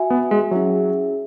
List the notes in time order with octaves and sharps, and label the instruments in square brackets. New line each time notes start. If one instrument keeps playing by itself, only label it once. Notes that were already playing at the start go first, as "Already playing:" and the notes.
Already playing: [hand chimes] F#4 E5 G#5
[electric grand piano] B3
G#3
[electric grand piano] F#3 [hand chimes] C#4 E4 G#4 E5